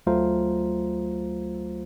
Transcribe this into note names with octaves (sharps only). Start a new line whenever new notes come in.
D2 F#3 A3 F4 C5 A#5